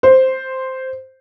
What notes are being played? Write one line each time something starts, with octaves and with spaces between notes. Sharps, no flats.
C5